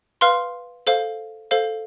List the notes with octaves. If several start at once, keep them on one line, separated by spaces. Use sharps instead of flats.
B4 F5 C6 F6
A4 C5 F5
A4 C5 F5